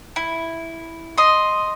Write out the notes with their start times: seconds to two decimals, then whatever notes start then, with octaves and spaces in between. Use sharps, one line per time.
0.16 E4
1.18 D#5 C6